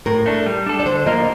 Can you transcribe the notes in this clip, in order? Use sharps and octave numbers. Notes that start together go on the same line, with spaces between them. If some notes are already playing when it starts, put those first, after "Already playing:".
A2 A#4
A3 D4
G3
D4 A4
D5
D3 C5
F3 A#3 F4 A#4 D#5